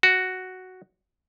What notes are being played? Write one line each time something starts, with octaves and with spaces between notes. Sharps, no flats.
F#4